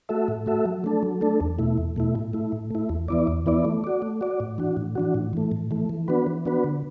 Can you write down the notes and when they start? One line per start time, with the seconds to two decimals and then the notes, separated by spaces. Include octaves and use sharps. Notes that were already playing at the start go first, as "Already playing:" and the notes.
0.09 A3 F#4 A4 E5
0.28 A2
0.46 A3 F#4 A4 E5
0.66 F#3
0.84 A3 D4 A4
1.03 F#3
1.21 A3 D4 A4
1.40 E2
1.59 B2 A3 E4
1.78 E2
1.96 B2 A3 E4
2.15 A2
2.33 A3 E4
2.52 A2
2.71 A3 E4
2.89 E2
3.08 E3 B3 E4 D5
3.27 E2
3.46 E3 B3 E4 D5
3.65 A3
3.84 F#4 D5
4.02 A3
4.21 F#4 D5
4.40 A2
4.58 E3 D4 F#4
4.77 A2
4.96 E3 D4 F#4
5.14 A2
5.33 E3 A3
5.52 A2
5.71 E3 A3
5.89 E3
6.08 B3 D4 F#4 B4
6.27 E3
6.46 B3 D4 F#4 B4
6.64 D3